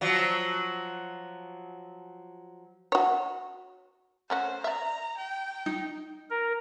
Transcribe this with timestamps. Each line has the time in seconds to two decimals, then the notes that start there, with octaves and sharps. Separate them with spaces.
0.01 F3 F#3
2.92 F#4 C#5
4.30 A3 C#4 F#4 C5
4.64 D5 E5 A#5
5.18 G5
5.66 D#4
6.30 A#4